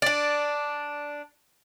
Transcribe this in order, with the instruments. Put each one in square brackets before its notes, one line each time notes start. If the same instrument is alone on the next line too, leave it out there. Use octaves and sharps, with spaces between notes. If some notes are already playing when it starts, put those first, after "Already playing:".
[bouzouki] D4 D5